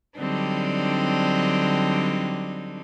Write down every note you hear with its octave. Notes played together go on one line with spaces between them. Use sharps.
D3 F#3 G3 C4 D4 D#4